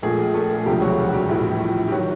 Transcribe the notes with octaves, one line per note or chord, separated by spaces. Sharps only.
A#1 A#2 F3 G#3 A3 G#4
A3 A4
E1 D2 C3 F3 G3 G#3 G4
F#3 F#4
F#4
G3 G4
A#1 A2 E3
G4
D#3 F#3 F#4